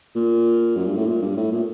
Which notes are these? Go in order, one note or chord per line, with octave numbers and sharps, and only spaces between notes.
A#2
F#2
G2
A2
A#2
G2
A2
A#2